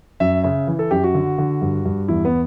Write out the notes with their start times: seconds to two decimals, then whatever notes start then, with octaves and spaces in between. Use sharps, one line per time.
0.20 F#2 E5
0.43 C#3 E5
0.67 E3
0.79 A4
0.91 F#2 G4
1.04 F#4
1.14 D3
1.38 D3
1.62 G2
1.85 G2
2.08 E2 E4
2.25 B3